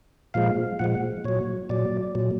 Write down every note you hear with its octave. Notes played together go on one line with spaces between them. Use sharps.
A#2 F3 G#3 F5
A#2 F3 G#3 F#5
A#2 F#3 C#5
A#2 F#3 D5
A#2 F#3